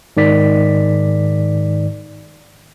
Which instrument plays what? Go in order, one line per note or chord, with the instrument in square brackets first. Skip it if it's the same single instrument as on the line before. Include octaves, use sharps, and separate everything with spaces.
[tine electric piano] G#2 D#3 D5 B6